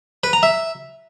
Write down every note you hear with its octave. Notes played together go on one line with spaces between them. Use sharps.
B4
A#5
E5